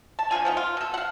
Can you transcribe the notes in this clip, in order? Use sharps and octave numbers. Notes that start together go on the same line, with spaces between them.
A5
D3 F3 F4 G#5
F3 B3 D#4
F4
B2 A4
F5 F#5